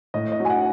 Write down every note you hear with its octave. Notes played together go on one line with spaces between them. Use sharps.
A2 D#5
D#5
F#3
G#5
F#5